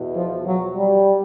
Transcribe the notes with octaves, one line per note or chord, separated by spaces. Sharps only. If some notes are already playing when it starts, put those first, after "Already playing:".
Already playing: E2 B2
F3
F#3
G3